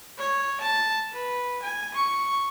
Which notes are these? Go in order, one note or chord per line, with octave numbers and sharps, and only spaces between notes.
C#5
A5
B4
G#5
C#6